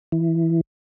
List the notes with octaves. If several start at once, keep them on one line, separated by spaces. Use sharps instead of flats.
E3